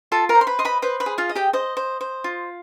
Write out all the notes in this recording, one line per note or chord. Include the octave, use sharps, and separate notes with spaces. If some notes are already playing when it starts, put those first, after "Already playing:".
F4 A4 A5
A#4 A#5
C5
C6
B4 B5
D#5 C6
B4 B5
B4 C5 B5
B4 B5
G#4
F4 F5
D#5
G4 G5
C5 D#5
C5
C5
F4